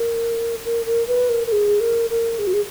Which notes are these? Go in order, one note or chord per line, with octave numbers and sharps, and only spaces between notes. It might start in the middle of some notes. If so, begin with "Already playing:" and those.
Already playing: A#4
A#4
A#4
B4
A#4
A#4
G#4
A#4
A#4
G#4
F#4
G#4